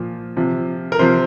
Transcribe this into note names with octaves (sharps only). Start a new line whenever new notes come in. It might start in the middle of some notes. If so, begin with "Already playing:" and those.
Already playing: A#2 F3
C3 F3
A#4
C3 F3 C5